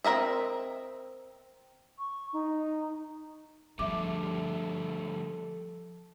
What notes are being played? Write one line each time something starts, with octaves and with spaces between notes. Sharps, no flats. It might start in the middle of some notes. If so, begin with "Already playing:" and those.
C4 E4 A#4 D#5 E5
C#6
D#4
D3 F3 G3 A3 A4 E5 D6